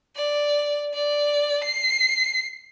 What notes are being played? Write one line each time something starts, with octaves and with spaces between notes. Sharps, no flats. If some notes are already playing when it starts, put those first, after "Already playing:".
D5
D5
C7